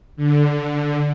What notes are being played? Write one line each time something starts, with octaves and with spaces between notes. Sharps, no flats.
D3